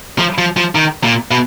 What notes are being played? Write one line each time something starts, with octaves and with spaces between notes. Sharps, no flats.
F3
F3
F3
D#3
A#2
B2